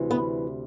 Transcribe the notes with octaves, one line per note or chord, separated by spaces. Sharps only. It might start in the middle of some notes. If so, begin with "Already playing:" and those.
Already playing: D2 C3 E3
B3